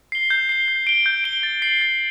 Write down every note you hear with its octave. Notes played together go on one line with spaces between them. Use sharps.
C7 G7
G6
C7 G7
G6
D7 G7
G6
D7 G7
A6
C7 F#7
A6